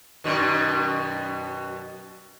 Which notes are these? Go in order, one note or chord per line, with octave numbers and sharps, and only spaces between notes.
F#2 B2 D#3